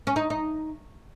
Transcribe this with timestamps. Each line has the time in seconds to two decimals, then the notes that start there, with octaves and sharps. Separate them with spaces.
0.07 C#4
0.16 D#4
0.30 D#4